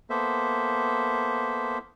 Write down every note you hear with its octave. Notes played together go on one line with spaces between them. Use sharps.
A#3 B3 A4 C5 E5